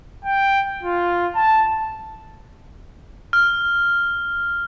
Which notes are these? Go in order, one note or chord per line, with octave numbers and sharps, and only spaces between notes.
G5
F4
A5
F6